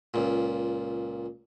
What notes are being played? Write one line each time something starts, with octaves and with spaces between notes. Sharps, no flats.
C#2 A#2